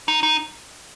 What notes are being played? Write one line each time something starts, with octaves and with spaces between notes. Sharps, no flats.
D#4
D#4